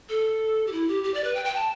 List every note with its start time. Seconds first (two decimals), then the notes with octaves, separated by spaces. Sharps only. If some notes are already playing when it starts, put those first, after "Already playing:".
0.09 A4
0.67 G4
0.72 E4
0.88 G4
1.03 G4
1.14 D5
1.24 B4
1.35 G5
1.45 G5
1.56 A5